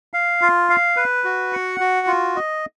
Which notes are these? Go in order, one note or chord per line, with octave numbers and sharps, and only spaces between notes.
F5
F4
F5
B4
F#4
F#5
F#4
F4
D#5